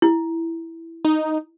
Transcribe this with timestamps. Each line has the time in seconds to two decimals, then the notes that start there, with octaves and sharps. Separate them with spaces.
0.02 E4
1.05 D#4